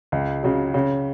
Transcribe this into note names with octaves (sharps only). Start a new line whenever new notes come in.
C#2
C#3 F#3
C#3